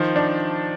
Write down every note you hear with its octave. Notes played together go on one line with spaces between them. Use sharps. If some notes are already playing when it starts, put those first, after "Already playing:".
Already playing: D#3 F3
D4